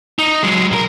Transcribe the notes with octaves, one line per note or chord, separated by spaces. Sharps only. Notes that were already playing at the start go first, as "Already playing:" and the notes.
D#4
F#3 G#3
B1 A#4